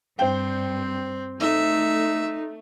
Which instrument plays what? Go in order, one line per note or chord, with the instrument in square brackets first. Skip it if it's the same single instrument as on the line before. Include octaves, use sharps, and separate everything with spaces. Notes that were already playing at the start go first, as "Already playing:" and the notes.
[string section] G2 [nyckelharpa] C4 [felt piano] C5 G5
[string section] A3 [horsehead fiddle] D#4 [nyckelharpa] E5